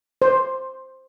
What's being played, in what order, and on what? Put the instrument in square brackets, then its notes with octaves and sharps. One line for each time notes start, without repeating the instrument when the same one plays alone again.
[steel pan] C5